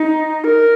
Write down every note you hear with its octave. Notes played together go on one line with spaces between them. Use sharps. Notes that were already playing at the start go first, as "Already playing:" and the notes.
Already playing: D#4
A#4